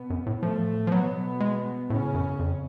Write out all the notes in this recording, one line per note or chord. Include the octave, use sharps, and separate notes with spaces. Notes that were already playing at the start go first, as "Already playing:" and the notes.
Already playing: B2 B3
F#2
A2
A2 F3 A3
F3
B2 F#3 B3
G#3
A2 C#3 C#4
F#2
F2